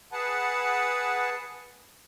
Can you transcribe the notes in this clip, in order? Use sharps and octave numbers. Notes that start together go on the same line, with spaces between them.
G#4 B4 F#5 A5